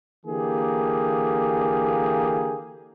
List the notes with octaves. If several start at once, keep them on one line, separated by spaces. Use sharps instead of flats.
D3 E3 A#3 G4 G#4